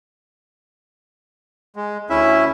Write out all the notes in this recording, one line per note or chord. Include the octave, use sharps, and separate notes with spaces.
G#3
D2 C#4 E4 E5